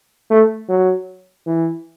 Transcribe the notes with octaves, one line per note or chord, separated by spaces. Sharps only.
A3
F#3
E3